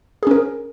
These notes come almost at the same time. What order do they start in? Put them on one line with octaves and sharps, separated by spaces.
G#4 C#4 A#4